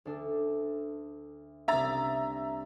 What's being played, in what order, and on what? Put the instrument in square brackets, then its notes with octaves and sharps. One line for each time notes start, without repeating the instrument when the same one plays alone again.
[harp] D2 D4 A4
[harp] C2 D4 [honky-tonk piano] E5 A#5 A6